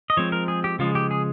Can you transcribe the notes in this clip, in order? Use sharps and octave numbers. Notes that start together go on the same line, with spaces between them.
D#5
F3 G#3 C4 C#5
A#4
G#4
G4
C#3 F3 G#3 F4
G4
G#4